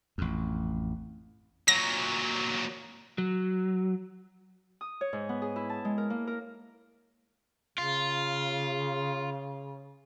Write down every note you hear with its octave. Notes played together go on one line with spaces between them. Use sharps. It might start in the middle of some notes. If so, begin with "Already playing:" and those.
A1 F2
A#2 F#3 A#6
F#3
D#6
C#5
G#2
B3
G#4
E4
A5
G#3
A#4
A#3
A#4
C#3 F4